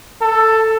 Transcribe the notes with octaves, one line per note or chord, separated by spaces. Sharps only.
A4